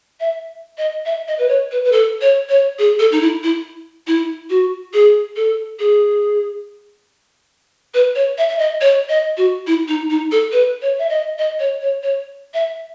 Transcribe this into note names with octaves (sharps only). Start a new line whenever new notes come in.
E5
D#5
E5
D#5
B4
C#5
B4
B4
A4
C#5
C#5
G#4
A4
D#4
E4
E4
E4
F#4
G#4
A4
G#4
B4
C#5
E5
E5
D#5
C#5
D#5
F#4
E4
D#4
D#4
A4
B4
C#5
E5
D#5
D#5
C#5
C#5
C#5
E5